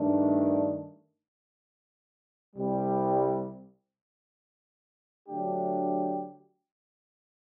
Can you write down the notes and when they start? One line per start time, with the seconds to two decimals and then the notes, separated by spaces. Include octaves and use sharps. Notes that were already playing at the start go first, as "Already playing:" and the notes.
Already playing: G2 D#3 A3 D4
2.56 C2 C3 G3
5.28 D3 F#3 A3 D4 G4